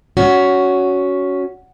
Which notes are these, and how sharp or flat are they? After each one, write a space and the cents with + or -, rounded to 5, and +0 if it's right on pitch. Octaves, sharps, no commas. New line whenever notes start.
C#4 +15 F#4 +0